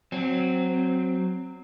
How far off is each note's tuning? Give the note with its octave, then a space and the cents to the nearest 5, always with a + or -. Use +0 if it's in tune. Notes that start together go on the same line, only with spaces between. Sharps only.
F#3 +0 C4 +0